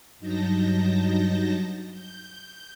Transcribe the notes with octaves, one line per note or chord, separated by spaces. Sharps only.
G2 F#3 D#4 A5 G6 A#6
G6